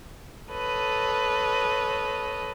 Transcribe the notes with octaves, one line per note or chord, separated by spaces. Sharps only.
A4 B4 C#5 D#5